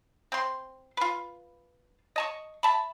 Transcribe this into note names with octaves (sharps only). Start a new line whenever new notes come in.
C4 C6
F4 B4
D#5 A5 C#6
E5 A5 B5